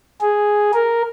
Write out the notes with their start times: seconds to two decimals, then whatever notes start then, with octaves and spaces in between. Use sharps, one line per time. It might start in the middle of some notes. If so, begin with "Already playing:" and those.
0.21 G#4
0.73 A#4